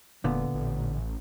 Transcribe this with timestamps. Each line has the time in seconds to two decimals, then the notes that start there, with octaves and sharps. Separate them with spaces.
0.24 E1 A#2 D3 B3
0.54 A1